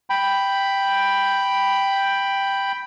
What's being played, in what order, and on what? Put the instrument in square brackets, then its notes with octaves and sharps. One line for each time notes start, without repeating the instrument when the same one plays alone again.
[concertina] G5 B5